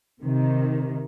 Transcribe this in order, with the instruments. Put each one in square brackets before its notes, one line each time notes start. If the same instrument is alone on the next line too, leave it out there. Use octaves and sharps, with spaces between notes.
[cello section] C3 D#3